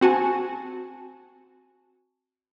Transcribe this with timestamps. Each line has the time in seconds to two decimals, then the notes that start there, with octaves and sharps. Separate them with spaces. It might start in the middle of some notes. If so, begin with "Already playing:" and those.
0.01 C4 F#4 G#5 A5